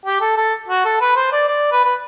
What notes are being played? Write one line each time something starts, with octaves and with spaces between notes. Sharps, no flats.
G4
A4
A4
F#4
A4
B4
C5
D5
D5
B4
B4